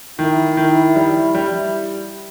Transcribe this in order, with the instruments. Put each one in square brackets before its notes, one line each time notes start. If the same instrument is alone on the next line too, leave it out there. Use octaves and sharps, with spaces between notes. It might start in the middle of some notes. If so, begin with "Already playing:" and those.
[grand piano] D#3 [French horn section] E4
[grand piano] D#3
G3
G3